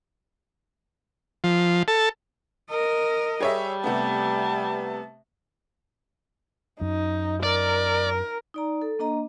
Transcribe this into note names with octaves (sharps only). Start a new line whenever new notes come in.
F3
A4
A#4 D#5
G3 G#4 C#5 E5
C3 A3 B3 A5
F#2 D#4
A#4 D5
D#4 D5 A#5
A4
A#3 D4 D#5 A#5